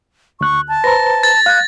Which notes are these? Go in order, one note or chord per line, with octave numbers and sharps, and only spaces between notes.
D2 C#6 F#6
A5
B4 C5 A#5 A#6
A6
F5 F#6 G#6